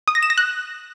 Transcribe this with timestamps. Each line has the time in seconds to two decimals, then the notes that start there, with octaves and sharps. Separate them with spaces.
0.08 D#6
0.15 A#6
0.23 E7
0.30 A#6
0.38 F#6